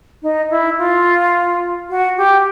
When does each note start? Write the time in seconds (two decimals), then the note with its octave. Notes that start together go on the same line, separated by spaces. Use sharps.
0.22 D#4
0.50 E4
0.78 F4
1.89 F#4
2.17 G4